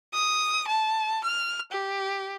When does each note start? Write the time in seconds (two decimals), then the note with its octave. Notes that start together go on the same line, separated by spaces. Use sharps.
0.14 D#6
0.68 A5
1.24 F6
1.72 G4